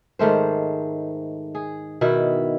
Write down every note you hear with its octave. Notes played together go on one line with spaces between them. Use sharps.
G#2 D#3 A3 C5
G#4
B2 D#3 E4